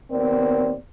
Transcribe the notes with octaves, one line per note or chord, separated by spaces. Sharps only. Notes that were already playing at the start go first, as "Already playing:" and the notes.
D#2 B3 C4 A#4 D5